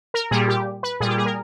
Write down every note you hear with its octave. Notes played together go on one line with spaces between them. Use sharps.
A#4
A#2 G3 G#4
G4
B4
A#2 G3 G#4
G4
G#4
A#4